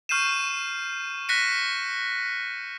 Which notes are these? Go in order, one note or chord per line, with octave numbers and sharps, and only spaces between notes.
C#6 F6 G6 C7 D#7 E7
F#6 A#6 B6 C#7 D#7